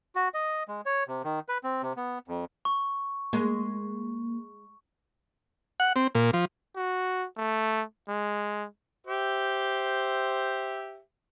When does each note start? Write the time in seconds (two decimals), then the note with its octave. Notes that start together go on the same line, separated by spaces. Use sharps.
0.15 F#4
0.34 D#5
0.68 G#3
0.86 C#5
1.08 C3
1.24 D#3
1.49 B4
1.64 C4
1.82 C3
1.97 B3
2.28 F2
2.65 C#6
3.33 G#3 A#3
5.80 F#5
5.96 C4
6.15 A#2
6.33 F3
6.76 F#4
7.37 A3
8.08 G#3
9.07 G4 C5 E5